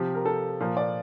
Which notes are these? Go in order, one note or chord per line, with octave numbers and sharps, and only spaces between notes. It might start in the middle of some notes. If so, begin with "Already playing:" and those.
Already playing: C3 F3 G4
A#4
A4
A#2 F3 A#4
D5